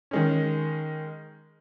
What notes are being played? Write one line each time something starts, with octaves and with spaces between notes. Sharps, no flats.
D#3 G#3 C#4